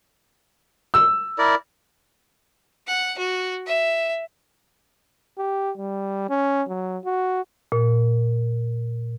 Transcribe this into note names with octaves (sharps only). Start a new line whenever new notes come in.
E6
E4 A#4 D5
F#5
F#4
E5
G4
G3
C#4
F#3
F#4
A#2